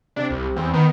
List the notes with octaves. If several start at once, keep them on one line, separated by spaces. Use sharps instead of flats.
C3 D4
C2
E2 C4
D#3 B3